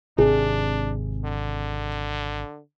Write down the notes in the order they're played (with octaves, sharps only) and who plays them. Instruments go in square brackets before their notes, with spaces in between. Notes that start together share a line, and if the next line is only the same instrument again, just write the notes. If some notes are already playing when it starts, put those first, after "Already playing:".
[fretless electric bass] G#1 C3 [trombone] D4 [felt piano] G#4
[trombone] D3